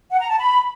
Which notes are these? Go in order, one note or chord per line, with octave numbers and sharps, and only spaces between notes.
F#5
A#5
A5
B5